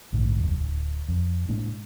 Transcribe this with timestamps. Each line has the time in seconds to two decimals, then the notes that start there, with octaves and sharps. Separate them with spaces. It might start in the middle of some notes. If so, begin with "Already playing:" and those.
0.12 A#1 G#2 D3 A3
0.38 F1 A#1 D#2 F#3
0.61 D1
1.09 F2
1.49 A2 G#3 A#3 D4